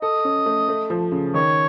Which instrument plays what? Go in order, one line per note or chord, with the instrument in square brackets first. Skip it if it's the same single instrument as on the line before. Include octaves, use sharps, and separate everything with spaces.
[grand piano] A4 [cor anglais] D#5
[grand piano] C#4
A3
A3
F3
C#3
[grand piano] D#3 [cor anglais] C#5